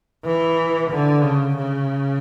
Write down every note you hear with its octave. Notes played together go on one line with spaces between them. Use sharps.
E3
D3
C#3
C#3